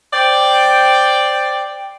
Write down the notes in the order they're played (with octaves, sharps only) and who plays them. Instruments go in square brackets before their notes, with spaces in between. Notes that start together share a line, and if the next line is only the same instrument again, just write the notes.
[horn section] C5 D5 G5